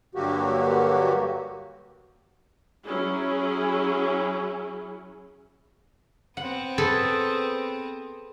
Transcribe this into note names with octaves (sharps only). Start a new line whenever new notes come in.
G2 D3 F#3 A#3 F#4 G4
F#3 C#4 E4 G#4
B3 C4 F#5
G#4 A4 B4